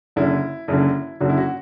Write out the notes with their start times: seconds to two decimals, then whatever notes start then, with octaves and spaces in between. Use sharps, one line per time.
0.16 F#1 F#2 D3 E4
0.68 F#1 F#2 D3 E4
1.20 F#1 F#2 D3 F#4
1.29 E4
1.37 F#4